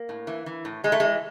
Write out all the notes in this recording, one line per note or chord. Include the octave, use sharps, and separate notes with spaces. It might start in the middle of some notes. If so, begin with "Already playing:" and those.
Already playing: A#3
A2
E3
E3
A2
A2 G#3
A3
E3 G#3